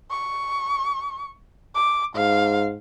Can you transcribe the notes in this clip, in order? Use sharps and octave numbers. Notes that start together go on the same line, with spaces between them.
C#6
D6
G#2 F5